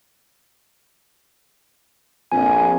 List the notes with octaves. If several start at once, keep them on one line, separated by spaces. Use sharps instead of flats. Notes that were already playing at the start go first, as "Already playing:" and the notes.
A#1 F2 G#5